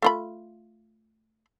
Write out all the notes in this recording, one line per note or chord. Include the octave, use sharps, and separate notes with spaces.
A3 F4 B5